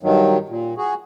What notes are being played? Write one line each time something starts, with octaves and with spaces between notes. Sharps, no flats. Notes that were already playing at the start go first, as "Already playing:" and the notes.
G2 D#3 F#3
A#2
F#4 G#4